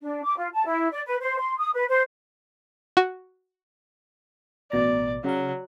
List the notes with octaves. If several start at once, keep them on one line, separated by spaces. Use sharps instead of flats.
D4
D6
F4
A5
E4
D5
B4
C5
C6
D#6
B4
C5
F#4
A1 B2 D5 A#5
C#3 F#3 F5